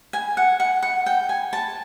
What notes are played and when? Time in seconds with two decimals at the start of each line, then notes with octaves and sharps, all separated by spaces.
0.13 G#5
0.37 F#5
0.60 F#5
0.83 F#5
1.06 G5
1.29 G#5
1.53 A5